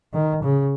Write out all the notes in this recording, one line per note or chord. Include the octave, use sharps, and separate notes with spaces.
D#3
C#3